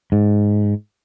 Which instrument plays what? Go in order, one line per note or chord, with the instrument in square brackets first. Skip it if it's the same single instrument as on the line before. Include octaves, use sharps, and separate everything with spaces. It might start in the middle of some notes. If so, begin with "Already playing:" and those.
[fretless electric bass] G#2